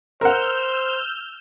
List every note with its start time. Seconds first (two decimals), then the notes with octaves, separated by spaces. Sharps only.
0.21 A#4 C5 F#5 E6 F6 G6